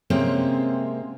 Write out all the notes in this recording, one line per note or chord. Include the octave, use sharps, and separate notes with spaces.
C3 G#3 A#3 C4 C#4